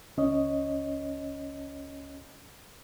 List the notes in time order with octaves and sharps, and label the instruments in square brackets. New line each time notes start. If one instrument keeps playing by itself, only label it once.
[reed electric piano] C#2 C#4 C#5 D#5